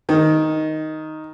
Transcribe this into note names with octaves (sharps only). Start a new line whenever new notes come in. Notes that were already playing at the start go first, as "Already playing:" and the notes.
D#3